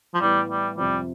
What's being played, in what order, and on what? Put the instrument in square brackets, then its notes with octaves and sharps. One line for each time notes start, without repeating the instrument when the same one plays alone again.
[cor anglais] F3
[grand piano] A2 E3 B3 [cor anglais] G3
[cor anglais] G3
[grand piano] F2 C3 F3 [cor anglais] G3